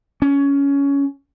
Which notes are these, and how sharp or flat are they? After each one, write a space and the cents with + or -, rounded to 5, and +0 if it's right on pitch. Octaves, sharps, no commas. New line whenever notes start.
C#4 +15